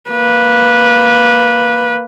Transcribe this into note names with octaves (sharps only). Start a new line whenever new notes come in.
A#3 B4